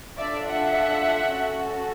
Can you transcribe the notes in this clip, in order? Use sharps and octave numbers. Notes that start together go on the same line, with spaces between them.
D4 F4 A4 D5 E5
E5 F#5
C#4 F#4 A4